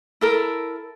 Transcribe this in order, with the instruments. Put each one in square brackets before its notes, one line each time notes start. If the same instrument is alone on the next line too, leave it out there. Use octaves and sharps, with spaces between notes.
[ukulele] E4 A4 A#4